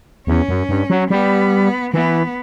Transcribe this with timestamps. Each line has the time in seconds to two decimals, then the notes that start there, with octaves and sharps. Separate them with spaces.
0.27 E2 C#4
0.49 F#2
0.69 G2
0.90 F#3
1.10 G3 B3
1.94 E3 B3